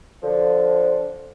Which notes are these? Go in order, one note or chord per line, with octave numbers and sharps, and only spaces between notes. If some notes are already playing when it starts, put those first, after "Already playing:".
D3 F3